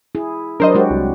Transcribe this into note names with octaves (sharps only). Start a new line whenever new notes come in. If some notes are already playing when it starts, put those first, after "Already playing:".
E4 G#4
F#3 D4 A#4 C5 D#5
G#3 F#4 G4
C2